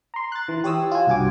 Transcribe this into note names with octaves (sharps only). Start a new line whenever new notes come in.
A#5 C6
F#6 A6
E3
G4 C#5 D#6 E6
F4 G#5
C2 G2 F#4 G#5 D6